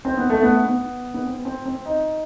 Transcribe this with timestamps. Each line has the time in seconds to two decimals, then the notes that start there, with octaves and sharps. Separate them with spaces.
0.05 C4
0.17 B3
0.30 A3
0.43 B3
0.65 B3
1.14 B3
1.25 C4
1.45 C4
1.66 C4
1.86 D#4